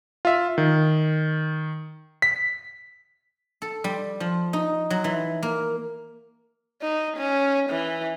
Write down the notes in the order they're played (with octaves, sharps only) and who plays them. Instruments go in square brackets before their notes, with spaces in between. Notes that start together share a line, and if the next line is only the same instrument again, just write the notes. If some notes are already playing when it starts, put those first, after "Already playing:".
[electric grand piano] F4 E5
D#3
B6
[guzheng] A4
G3
F3
D#4
F#3
E3
A#3
[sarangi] D#4
C#4
E3